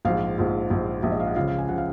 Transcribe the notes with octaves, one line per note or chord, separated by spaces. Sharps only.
A#1 G#2 F3 F5
A#1 G#2 F3
A#1 G#2 F3
A#1 G#2 F3 E5
D#5
F5
F#5
C#2 C#3 F3 F5
F5
G#5
C#3 F3 F#5
F5